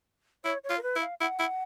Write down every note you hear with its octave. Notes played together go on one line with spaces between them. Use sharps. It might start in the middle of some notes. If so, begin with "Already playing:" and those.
E4 C#5
C#5
F4
A#4
B4
E4
F5
E4 F#5
E4